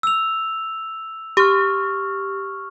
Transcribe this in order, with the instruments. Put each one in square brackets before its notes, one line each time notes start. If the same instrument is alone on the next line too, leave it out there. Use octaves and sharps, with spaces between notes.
[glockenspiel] E6 F7
[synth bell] G4 [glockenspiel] C#6 F6